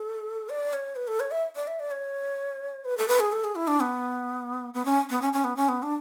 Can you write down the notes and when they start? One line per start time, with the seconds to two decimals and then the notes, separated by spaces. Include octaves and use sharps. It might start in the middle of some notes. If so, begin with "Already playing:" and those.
Already playing: A4
0.49 D5
0.73 C#5
0.96 B4
1.07 A4
1.20 C#5
1.31 E5
1.56 D5
1.67 E5
1.79 D5
1.91 C#5
2.85 B4
2.97 A4
3.08 B4
3.20 G#4
3.32 A4
3.44 G#4
3.55 E4
3.67 D4
3.80 B3
4.74 B3
4.85 C#4
5.10 B3
5.21 C#4
5.33 C#4
5.44 B3
5.56 C#4
5.69 B3
5.83 D4